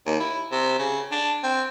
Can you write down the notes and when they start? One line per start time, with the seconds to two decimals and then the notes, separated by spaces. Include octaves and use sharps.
0.06 D#2
0.20 E4
0.52 C3
0.79 C#3
1.12 D4
1.44 C4